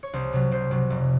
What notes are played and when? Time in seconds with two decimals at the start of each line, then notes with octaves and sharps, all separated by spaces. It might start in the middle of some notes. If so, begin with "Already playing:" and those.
0.03 C#5
0.13 C2 C5
0.33 C3 F#3
0.51 C2 C5
0.71 C3 F#3
0.90 F1